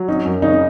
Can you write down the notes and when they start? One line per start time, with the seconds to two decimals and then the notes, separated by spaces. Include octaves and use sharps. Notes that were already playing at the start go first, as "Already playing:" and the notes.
Already playing: F#3
0.08 C#4 D#4
0.25 F#2
0.42 C#3 D#4